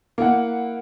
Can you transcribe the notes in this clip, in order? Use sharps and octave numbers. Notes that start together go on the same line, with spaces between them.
A#3 E4 F#5